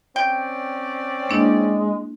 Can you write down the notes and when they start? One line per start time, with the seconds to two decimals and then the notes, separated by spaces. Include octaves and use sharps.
0.16 C4 C#4 D5 G5
1.30 G#3 A#3 D4 E4